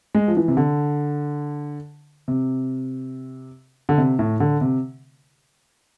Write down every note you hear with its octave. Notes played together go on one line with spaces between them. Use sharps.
G#3
F3
E3
C3
D3
C3
D3
C3
A2
D3
C3